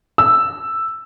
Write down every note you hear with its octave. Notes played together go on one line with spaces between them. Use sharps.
E6